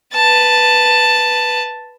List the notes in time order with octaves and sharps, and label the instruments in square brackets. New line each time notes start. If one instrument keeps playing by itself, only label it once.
[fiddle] B4 A5